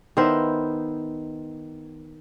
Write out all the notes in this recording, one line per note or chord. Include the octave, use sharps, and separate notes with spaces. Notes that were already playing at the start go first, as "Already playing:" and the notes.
D#3 B3 E4 C5